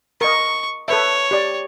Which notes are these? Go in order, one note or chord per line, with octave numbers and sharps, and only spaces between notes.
A#4 D#5 C#6
A4 B4 C#5 E5
G4 D5